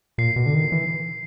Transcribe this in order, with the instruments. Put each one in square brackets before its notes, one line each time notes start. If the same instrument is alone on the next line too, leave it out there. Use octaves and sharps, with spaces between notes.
[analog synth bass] A#2 [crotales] C7
[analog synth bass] B2
D3
D#3
E3